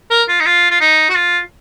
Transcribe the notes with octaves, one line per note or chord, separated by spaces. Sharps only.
A#4
F4
D#4
F4
F4
D#4
F#4
F4